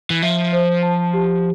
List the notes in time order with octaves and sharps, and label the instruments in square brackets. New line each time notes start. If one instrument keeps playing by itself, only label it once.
[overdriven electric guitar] E3
[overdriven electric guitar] F3 [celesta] E5
[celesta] C5
A5
G4